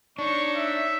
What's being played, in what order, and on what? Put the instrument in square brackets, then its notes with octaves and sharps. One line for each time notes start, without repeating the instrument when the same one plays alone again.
[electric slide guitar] D4 [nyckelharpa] D#4 C#5 [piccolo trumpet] C#6
[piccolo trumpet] E5